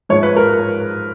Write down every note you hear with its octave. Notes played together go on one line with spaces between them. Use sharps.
G#2 F3 C#5
B4
A#4